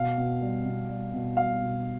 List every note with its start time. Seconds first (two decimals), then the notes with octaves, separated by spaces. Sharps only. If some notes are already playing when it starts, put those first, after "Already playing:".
Already playing: B2 F5
0.18 B2
0.41 G3
0.65 B2
0.89 G3
1.14 B2
1.37 G3 F5
1.61 B2